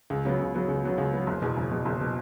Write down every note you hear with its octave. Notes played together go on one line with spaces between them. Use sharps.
C#2
C#3 F#3 B3
C#2
C#3 F#3 B3
C#2
C#3 F#3 B3
C#2
C#3 F#3 B3
F#1
E2 B2
F#1
E2 B2
F#1
B2